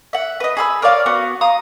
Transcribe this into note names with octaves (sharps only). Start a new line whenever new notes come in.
E5 F#5
B4 D#5
G#4 B5 E6
A#4 C#5 D5 F5
B3 F#4
F5 A#5 D#6